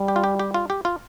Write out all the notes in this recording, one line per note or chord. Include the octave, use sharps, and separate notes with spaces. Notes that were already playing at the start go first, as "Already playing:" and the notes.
Already playing: G3
G4
F4
G4
G4
F4
G4
F4